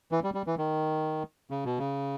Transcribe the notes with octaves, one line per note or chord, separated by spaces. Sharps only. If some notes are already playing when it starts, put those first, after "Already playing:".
E3
G3
G3
E3
D#3
C#3
B2
C#3